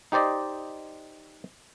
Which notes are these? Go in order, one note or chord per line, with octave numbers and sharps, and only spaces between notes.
D#4 G4 C5 D5 D#5